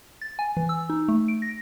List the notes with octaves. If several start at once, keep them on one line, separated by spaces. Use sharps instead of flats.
A6
G#5
E3
E6
D#4
A3
D7
A#6